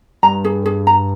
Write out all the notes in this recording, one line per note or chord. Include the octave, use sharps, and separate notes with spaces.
G2 A#5
G#4
G#4
A#5